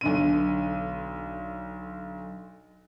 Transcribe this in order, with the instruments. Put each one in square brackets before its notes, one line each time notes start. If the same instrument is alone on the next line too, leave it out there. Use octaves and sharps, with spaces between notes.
[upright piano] B1 D3 D#7